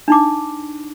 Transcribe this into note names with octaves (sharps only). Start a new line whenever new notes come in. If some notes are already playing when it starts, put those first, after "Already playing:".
D4 D#4 D6